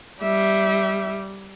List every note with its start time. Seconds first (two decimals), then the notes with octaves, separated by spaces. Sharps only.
0.22 G3 E5